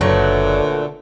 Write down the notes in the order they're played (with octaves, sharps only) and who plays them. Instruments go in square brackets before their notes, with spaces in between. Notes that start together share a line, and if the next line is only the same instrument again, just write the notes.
[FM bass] F#1 [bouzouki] A#2 A3 F#4 [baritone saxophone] D3 [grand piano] B4 C#5 A5